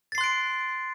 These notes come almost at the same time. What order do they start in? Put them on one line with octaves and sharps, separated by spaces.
A6 C7 C6 F#6 D7